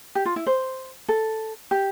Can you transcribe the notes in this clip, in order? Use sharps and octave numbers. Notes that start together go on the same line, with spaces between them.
G4
F4
E4
C5
A4
G4